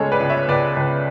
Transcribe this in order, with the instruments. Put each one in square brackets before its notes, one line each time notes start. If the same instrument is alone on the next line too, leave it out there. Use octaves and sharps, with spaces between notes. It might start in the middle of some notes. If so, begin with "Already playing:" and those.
Already playing: [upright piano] C#2 C#3 G#3 G#4 A4 C#5
B4 D5
C#2
C#5 E5
C#2 B4 D5
C#2